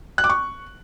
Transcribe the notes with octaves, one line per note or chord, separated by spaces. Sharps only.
F#6
D6
C#6